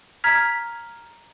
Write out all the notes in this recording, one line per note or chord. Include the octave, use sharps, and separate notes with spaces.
A#5 F6 G#6 B6